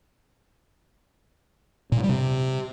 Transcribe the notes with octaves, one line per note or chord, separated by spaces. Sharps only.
A#2
G2
G3
C3